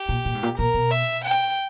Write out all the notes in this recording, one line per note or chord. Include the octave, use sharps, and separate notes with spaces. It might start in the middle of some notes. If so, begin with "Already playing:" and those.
Already playing: G4
A#2
A#2
G#2
A#2
A#2 A#4
B2
E5
G5